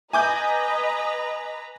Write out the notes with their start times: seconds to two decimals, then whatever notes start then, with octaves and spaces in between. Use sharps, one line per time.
0.13 B4 D#5 G#5 A#5 D6 G6